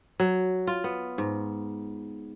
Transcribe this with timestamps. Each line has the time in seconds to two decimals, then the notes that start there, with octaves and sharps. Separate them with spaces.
0.20 F#3
0.67 F4
0.84 B3
1.18 G#2